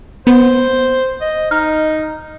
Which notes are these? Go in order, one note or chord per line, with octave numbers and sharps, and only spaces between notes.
B3 C5
D#5
D#4 F6